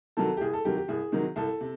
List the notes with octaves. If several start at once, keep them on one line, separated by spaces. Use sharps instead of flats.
C3 D#3 F#3 A4
G4
C2 G#4
A4
C3 D#3 F#3 G4
G4
C2 G#4
C3 D#3 F#3
C2 A4
C3